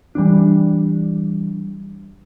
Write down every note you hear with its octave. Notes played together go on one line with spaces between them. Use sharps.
E3 G3 B3 D4